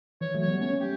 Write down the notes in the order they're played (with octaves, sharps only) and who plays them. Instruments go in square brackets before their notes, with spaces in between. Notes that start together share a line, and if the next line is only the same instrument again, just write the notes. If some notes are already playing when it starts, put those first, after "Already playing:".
[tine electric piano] E3 [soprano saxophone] C#5
[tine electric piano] F#3 A3
[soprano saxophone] C#5
[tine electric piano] G3 B3
[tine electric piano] A3 C#4 [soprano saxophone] C#5
[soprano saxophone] G4